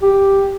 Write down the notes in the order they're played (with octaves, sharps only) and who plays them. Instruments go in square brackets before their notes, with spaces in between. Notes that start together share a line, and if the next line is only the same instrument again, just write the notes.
[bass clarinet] G4